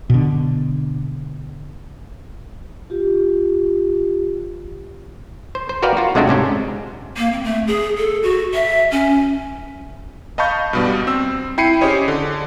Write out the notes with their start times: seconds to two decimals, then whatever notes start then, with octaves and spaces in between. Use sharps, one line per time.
0.10 B2 D3
2.90 F4 G4
5.55 C5
5.69 C5
5.82 F#4 A#4 B4 D5 F5 G5
5.97 F4 F#4
6.15 C3 G#3 A3 D4 F#4 G4
6.28 G#2 C3 C#4 C5
7.17 A#3
7.32 C4
7.44 A3
7.67 G#4
7.98 A4
8.23 F#4
8.54 E5
8.91 C#4
10.38 D#5 F5 A5 B5 C#6 G6
10.73 G2 B2 G3
11.07 C4 E6
11.58 E4 G5 B5 C7 C#7 D#7
11.81 C#4 G4 G#4 C5 C#5 D#5
12.08 D3